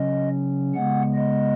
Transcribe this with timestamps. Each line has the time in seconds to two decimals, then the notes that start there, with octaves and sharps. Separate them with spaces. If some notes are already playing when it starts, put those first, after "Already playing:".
Already playing: C#3 F#3 C#4 D#5
0.75 C#3 G#3 B3 F#5
1.15 D#5